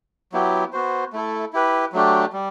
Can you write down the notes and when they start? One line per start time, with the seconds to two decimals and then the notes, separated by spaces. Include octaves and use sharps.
0.32 F#3 B3 E4 G4
0.73 B3 F#4 C5
1.13 A3 E4 A4
1.53 E4 G4 B4
1.93 F#3 A3 D4 G4
2.33 G3